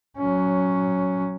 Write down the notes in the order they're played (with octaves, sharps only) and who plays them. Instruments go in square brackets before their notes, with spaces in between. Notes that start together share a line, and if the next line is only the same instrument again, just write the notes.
[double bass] F#3 C#4